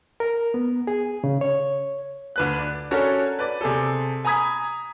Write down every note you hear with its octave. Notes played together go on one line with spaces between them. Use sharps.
A#4
B3
G#4
C#3
C#5
D2 B4 F#6
D5
C#4 D4 F#4 A4 A#4 C#5
B4 D5
C3 G#4 A4
G#5 A#5 B5 D#6 G#6 B6